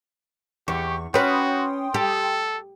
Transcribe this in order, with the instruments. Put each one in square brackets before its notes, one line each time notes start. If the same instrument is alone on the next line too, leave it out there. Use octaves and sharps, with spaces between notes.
[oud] E2 [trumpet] G4 [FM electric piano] C#6
[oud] C#4 B4 [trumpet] F#4 [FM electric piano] G5 C6 D#6
[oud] G4 [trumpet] A4